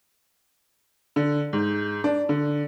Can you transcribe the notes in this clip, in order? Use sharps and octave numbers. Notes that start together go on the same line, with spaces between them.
D3
G#2
D4
D3